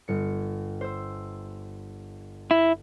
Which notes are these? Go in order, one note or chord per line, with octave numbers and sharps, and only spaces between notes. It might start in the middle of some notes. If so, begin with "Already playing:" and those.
G1 C#7
C5 E6
E4